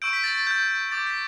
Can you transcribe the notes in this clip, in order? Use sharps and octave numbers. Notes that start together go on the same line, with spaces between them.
C#6 E6 G6 D7
B6
A6
A6
G6
D6 G6 A6
B6